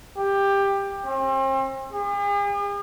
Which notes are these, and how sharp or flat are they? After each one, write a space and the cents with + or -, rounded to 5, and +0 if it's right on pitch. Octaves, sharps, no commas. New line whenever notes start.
G4 +15
C4 +40
G#4 -45